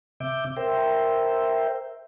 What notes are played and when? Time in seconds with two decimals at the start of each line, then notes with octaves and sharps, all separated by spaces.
0.20 C3 E5 D6 G6
0.57 A#4 C5 E5 G5